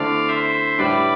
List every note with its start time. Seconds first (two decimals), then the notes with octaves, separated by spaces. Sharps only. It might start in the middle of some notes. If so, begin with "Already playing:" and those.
Already playing: D3 A3 C4 E4 D5 F5
0.27 C5 E5
0.78 A2 G3 D4 B4 D5